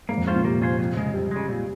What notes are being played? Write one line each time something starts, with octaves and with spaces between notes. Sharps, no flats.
G#2 A#3
F2
G#2 C#4 F4 C5
A#2
C3 A#3
C#4 F4 C5
F2
C#3 G#3
F2 G3
C#3 G#3
A#2